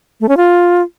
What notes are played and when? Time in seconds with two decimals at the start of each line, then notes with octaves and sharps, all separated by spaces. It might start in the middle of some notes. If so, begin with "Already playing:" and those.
0.21 A3
0.29 C#4
0.37 F4